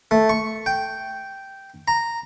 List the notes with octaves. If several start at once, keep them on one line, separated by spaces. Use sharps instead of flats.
A3
C#6
G5
A#5